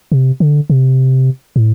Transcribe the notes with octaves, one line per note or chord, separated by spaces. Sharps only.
C3
D3
C3
A2